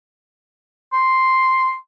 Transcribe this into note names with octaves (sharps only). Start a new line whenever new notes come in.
C6